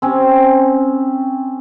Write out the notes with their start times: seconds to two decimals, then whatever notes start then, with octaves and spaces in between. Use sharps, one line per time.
0.02 C4 C#4